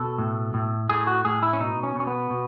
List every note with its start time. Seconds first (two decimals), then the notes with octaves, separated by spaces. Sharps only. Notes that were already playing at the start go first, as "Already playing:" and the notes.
Already playing: B2 A4
0.18 A2
0.54 A2
0.89 A2 G#4
1.07 F#4
1.25 A2 G#4
1.43 E4
1.53 C#4
1.60 B2 D#4
1.83 C#4
1.95 B2 C#4
2.07 B3
2.30 B2